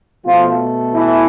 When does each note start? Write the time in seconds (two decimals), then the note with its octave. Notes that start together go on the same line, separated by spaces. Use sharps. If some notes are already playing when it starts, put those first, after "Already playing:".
0.25 B2 F3 A3 F4
0.93 E3 E4